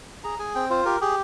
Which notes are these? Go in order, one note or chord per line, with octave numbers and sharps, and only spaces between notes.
G#4 A#5
G#4 G#5
C4 G5
F4 C5
G4 A#4
G4 G#4